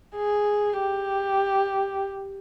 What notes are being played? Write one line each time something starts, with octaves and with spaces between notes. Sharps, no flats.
G#4
G4